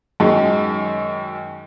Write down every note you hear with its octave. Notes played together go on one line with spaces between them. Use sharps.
F#2 D#3 G#3